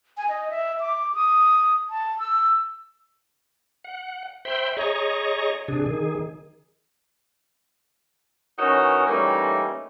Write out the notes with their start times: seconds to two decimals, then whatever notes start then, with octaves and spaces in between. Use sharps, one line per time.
0.17 G#5
0.29 D#5
0.50 E5
0.80 D6
1.14 D#6
1.90 A5
2.19 E6
3.84 F#5
4.45 C5 E5 G5 B5 C6
4.77 G#4 C#5 D#5 A#5 C#6
5.68 C3 D4 G#4
5.86 D#3 G#4
8.59 E3 C#4 D#4 F#4 A#4 C#5
9.07 E3 G3 A3 A#3 C#4 D#4